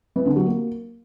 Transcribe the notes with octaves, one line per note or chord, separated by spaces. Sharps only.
E3
D3
F#3
A#3